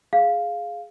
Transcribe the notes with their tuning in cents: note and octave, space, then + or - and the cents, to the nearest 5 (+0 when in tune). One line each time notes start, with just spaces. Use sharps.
G#4 +10 F5 +0